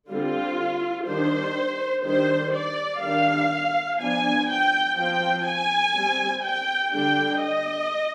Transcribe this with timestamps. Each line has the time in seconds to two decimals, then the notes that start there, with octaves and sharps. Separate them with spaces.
0.08 D3 G3 C4 F4
1.05 D#3 G3 D4 C5
2.04 D#3 G3 D4 C5
2.53 D5
3.01 D#3 G3 D4 F5
3.99 F3 B3 D4 G#5
4.47 G5
4.96 F3 C4 G5
5.45 G#5
5.94 G3 C4
6.42 G5
6.92 D3 G3 D4 G5
7.40 D#5